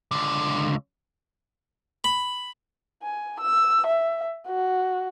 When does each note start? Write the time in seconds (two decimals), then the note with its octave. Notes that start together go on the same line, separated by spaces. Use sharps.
0.11 C#2 D3
2.04 B5
3.02 G#5
3.40 E6
3.86 E5
4.47 F#4